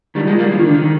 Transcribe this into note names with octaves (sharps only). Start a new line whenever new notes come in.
D#3 G3
F3 G#3
G3 A#3
F3
D#3
D3
D#3